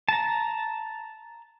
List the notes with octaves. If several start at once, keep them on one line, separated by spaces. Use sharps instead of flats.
A5 A#5